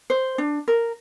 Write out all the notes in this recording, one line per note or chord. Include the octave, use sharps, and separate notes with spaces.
C5
D4
A#4